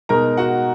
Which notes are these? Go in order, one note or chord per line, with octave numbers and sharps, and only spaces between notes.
B2 G#3 D#4 A#4 A#5
F#4 F#5